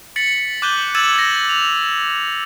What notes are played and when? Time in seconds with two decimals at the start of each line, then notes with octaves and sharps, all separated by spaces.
0.16 A6 B6 C#7 F#7
0.62 D6 F#6 G6 D#7 F#7 G7
0.95 E6 G#6 A6 D#7 E7 F#7
1.18 A#6
1.49 F7